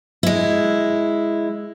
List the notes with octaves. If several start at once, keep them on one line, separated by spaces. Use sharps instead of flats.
G#3 E4